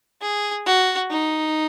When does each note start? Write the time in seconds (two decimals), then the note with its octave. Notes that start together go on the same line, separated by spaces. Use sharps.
0.21 G#4
0.66 F#4
1.11 D#4